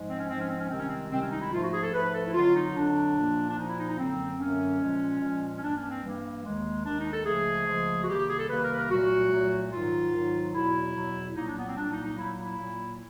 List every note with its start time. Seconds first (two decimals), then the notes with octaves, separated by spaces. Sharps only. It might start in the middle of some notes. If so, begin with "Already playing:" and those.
Already playing: G#2 F3 G#3
0.09 C4
0.18 C#4
0.29 G#2 F3 G#3 C4
0.39 C#4
0.49 C4
0.59 C#4
0.69 C2 C3 D#3 G#3 C4
0.79 C#4
0.89 C4
1.11 C2 C3 D#3 G#3 C4
1.21 C#4
1.31 D#4
1.42 E4
1.52 G#2 F3 A3 F4
1.62 F#4
1.73 G#4
1.83 A4
1.93 G#2 F3 A3 B4
2.14 A4
2.26 E4
2.34 F2 D3 F#3 F4
2.55 D#4
2.75 F2 D3 F#3 D4
3.16 A#2 F3 A#3
3.48 D4
3.57 A#2 F3 A#3 D#4
3.67 E4
3.77 D#4
3.88 D#4
3.98 F#2 D3 F#3 A#3 C4
4.39 F#2 D3 F#3 A#3 C#4
4.80 A#2 F3 G#3
5.20 A#2 F3 G#3
5.56 C#4
5.62 G2 E3 G3 A#3 D4
5.76 C#4
5.89 C4
6.03 G2 E3 G3 A#3
6.44 D#2 D#3 G#3
6.85 D#2 D#3 G#3 D4
6.98 D#4
7.12 A4
7.25 C#2 C#3 F3 A3 G#4
7.66 C#2 C#3 F3 A3
8.02 F#4
8.08 C2 C3 D#3 G3 A#3 G4
8.19 G4
8.29 G#4
8.38 A4
8.48 C2 C3 D#3 G3 A#3 B4
8.63 A#4
8.72 B4
8.76 A#4
8.90 C2 A#2 F#3 A3 F#4
9.31 C2 A#2 F#3 A3
9.71 G#2 D#3 F#3 F4
10.13 G#2 D#3 F#3
10.53 E2 B2 F#3 E4
10.95 E2 B2 F#3
11.35 C2 A#2 F#3 A#3 D#4
11.46 D4
11.56 B3
11.66 C4
11.76 C2 A#2 F#3 A#3 D4
11.90 D#4
12.04 D#4
12.17 A#2 F#3 A#3 E4
12.45 E4
12.59 A#2 F#3 A#3